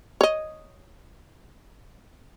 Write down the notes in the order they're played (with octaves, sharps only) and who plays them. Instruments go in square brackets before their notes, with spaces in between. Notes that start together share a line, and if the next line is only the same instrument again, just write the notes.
[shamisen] C#5 D#5